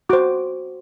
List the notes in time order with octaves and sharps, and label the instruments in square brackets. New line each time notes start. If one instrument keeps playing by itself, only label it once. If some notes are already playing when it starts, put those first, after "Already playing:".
[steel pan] F#4 C5 D6